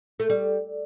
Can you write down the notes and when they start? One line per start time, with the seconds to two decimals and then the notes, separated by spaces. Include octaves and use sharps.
0.20 A3
0.30 G3